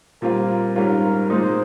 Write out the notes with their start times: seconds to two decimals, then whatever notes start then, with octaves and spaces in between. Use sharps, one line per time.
0.22 A#2 G3 C4 F4 A#4
0.76 G#2 G3 C#4 F4 A#4
1.30 A#2 G#3 C4 D#4 C5